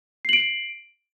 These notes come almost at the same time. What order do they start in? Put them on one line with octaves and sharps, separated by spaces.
C7 F#7 D7